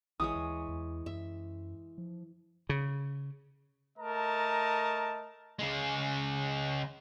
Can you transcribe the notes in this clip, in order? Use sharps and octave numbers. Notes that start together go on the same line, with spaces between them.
A#1 E3 G#3 C#5 D#6
D#2
E2
F#2 E5
F3
C#3
A3 A#4 D#5 A5 A#5
C#3 G#3